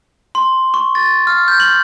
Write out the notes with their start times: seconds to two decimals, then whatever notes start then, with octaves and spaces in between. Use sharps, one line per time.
0.35 C6
0.74 C#6
0.95 A6
1.27 F6
1.48 G6
1.60 F#7